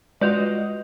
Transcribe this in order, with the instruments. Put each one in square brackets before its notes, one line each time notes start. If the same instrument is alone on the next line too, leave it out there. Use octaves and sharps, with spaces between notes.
[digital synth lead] G#3 [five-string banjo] F4 F#4 D5 [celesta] B4 G6 F7 [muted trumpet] D#5